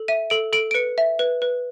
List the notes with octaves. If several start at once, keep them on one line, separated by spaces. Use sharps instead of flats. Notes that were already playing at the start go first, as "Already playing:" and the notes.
Already playing: A4
E5 D#7
A4 D7
A4 D7
D7
B4 C#7
E5
B4
B4